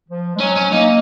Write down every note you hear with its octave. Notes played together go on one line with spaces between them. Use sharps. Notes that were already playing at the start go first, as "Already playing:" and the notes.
F3
G#3
F#3 C#4
C#4
A#3 D#4